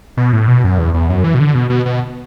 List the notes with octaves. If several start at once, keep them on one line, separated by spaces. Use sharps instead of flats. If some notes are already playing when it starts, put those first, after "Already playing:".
B2
A2
B2
F#2
E2
E2
F#2
E3
B2
D3
B2
B2
B2